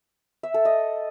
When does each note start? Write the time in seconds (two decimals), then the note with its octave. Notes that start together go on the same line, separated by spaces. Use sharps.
0.43 E5
0.54 A4
0.65 D#5